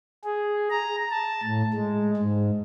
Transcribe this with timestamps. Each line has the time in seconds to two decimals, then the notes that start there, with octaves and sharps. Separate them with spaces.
0.24 G#4
0.70 A#5
1.11 A5
1.44 A2
1.74 G#3
2.17 G#2